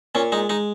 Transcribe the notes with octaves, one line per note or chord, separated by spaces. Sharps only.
A#2 C#4
G#3 D#4
G#3 D#4